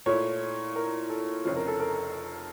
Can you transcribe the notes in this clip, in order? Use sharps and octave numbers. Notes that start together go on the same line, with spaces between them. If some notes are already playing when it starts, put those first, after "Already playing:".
A#2 A3 E4 C#5
A#4
A4
F1 F2 C#3 F3 C#5
A#4
A4
A#4